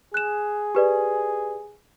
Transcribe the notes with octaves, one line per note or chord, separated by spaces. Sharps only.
G#4 F#6 E7
G4 B4 D5